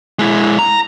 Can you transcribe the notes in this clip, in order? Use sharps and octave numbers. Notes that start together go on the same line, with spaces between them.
G#3 E4
A#5